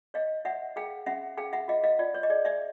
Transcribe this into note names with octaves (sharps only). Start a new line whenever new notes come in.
C#5 D#5 F5
C#5 E5 F#5
G#4 F5 G5
C#4 E5 F#5
G#4 F5 G5
E5 F#5
F4 D#5 F5
D#5 F5
F4 D5
C#5
D#5
G#4 D5
D5 E5